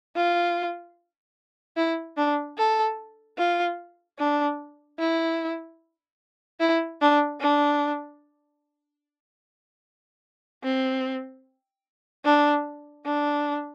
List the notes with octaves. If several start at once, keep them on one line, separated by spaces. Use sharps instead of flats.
F4
E4
D4
A4
F4
D4
E4
E4
D4
D4
C4
D4
D4